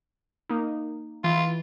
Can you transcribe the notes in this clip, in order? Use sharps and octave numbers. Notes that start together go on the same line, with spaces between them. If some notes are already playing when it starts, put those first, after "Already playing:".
A#3 D#4
E3 F4